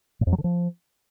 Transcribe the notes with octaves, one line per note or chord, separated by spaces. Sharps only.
A2
F2
F#3
D3
F3